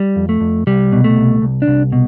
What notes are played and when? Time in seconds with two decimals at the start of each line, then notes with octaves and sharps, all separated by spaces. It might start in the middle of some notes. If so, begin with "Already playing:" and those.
Already playing: G3
0.16 F2
0.29 A3
0.40 F2
0.67 C2 G3
0.92 B2
1.04 A3
1.16 C2
1.42 C2
1.62 D4
1.68 C2
1.92 B2